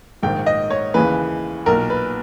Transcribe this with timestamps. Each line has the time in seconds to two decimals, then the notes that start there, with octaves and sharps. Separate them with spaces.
0.23 A#1 G#2 D#3 G5
0.46 D#5
0.70 C#5
0.94 D#2 C#3 E3 B4
1.66 B1 A#2 A#4
1.90 B4